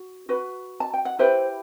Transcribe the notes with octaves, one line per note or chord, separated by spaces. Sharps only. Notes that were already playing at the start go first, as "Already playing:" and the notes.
Already playing: F#4
F#4 B4
A5
G5
F#5
E4 G4 B4 C5 E5